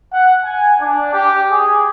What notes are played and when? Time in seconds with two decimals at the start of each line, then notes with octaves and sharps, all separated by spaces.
0.13 F#5
0.44 G#5
0.81 D4
1.14 G4
1.50 G#4